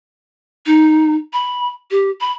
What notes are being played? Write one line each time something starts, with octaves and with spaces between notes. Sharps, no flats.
D#4
B5
G4
B5